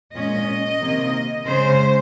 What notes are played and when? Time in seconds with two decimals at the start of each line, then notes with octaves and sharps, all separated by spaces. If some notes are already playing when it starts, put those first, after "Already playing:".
0.14 A#2 G#3 C#4 D#5
0.80 C3 D#3 A#3
1.45 C#3 G#3 C#4 C5